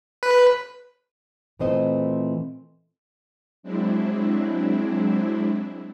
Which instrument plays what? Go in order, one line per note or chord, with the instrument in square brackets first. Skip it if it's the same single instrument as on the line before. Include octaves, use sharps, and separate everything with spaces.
[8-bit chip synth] B4
[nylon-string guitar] A#2 E3 A3 C4 C5 D#5
[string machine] F#3 G#3 C4 D4 E4